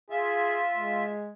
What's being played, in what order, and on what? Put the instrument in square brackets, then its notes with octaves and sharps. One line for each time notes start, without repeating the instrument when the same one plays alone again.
[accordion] F4 E5 [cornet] G#4
[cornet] G#3